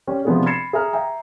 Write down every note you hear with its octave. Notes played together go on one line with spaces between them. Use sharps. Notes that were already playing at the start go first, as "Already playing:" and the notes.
G3 C#4 G5
C3 F3 G#3 B3 D4 G#4
B5 G#6 A6 C7 C#7 E7
G#4 E5 A#5 F6
E5 G5 G#5 A#5